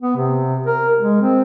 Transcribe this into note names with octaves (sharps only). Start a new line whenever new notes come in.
B3
C3
A#4
G#3
C4